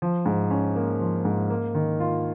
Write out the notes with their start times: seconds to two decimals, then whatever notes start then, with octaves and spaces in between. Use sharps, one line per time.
0.02 F3
0.26 G#2
0.51 C#4
0.76 A#3
1.00 F3
1.25 G#2
1.50 A#3
1.75 D#3
2.00 F4